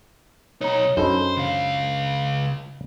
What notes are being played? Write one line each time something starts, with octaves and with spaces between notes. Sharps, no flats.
B1 D#4 C#5 A#5
F#2 D4 D#4 A4 C5 B5 E6
C#2 F5